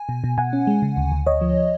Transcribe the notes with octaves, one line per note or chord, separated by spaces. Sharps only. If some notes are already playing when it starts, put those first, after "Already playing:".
Already playing: G#5
B2
B2
B2 F#5 G#5
C#4
G#3
C#3
D2
D2
D2 C#5 D#5
F3